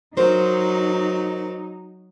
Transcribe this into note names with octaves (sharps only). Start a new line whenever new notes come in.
F#3 D#4 A#4 C5